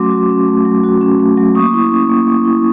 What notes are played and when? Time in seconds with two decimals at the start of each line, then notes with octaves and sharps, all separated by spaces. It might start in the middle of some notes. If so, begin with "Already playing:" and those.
Already playing: F#3 A3 C#4 F#4 C6 D6
0.11 F#4
0.29 C#4
0.48 A3
0.65 F#3
0.84 F#4
1.01 C#4
1.20 A3
1.37 F#3
1.55 A#3 C#6 D#6
1.73 E4
1.92 C#4
2.09 A#3
2.28 A#3
2.45 E4